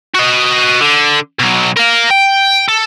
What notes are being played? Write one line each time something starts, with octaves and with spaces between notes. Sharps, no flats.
F#4 D#5
D3
B2 F#3
A#4 F5
G5
A4